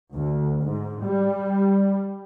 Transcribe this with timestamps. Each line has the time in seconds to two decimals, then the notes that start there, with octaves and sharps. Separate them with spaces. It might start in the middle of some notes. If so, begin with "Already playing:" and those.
0.14 D2
0.63 G#2
1.04 G3